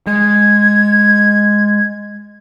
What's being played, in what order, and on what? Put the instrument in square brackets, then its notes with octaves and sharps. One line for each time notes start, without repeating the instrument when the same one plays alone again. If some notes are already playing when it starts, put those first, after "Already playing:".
[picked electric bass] G#3 [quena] G#6